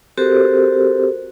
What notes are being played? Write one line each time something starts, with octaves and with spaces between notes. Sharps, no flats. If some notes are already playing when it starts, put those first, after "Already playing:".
C4 F#4 G4 A4 A#4 C5